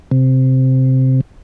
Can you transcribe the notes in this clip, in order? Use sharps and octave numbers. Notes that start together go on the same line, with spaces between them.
C3